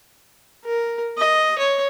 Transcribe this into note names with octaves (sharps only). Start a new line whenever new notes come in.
A#4
D#5
C#5